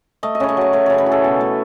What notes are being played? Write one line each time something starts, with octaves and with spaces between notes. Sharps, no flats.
A3 D#5
D#5
C#3 C#5
D#5
F#3 C#5
A3 C#5
C#3 C#5
B4
E3
A4
B2
A3